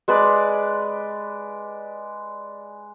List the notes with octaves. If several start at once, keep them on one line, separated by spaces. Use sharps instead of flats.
G#3 B4 D5